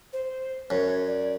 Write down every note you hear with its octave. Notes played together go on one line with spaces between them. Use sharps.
C5
F#2 C#5
D5